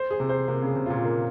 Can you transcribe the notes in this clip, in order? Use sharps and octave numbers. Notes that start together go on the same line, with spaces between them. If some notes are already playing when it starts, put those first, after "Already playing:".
Already playing: C5
G#4
C3
C5
C3 A#3
C#3
G#4
C3
A#2 F4
A#3